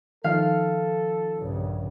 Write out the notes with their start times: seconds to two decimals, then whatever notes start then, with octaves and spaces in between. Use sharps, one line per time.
0.24 D#3 F3 A4 F5
1.37 A#1 G2 C#3